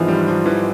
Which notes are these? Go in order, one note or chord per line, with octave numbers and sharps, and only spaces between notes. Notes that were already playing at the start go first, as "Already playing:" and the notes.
Already playing: G#1 G#2 E3 F3
G3
F3
E3